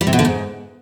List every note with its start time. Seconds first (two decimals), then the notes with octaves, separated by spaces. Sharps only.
0.01 G3
0.07 C3
0.13 B2
0.19 D3
0.25 G#2